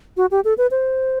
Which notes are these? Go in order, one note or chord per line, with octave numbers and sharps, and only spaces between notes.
F#4
G4
A4
B4
C5